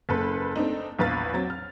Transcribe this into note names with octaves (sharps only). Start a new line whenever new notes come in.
F#1 A4 B4
A3 C4 D4 D#4
A#1 E2 B4 F5 A6
F#3 C4 A6
F6